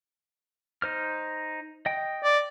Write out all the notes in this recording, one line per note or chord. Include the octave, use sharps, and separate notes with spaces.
D#4 C5 F6
D#5 G5
D5